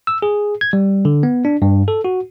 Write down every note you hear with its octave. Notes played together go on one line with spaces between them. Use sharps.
E6
G#4
G#6
G3
D3
B3
D4
G2
A4
F#4